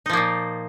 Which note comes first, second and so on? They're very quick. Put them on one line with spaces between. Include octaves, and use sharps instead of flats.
D#4 F3 A#3 A#2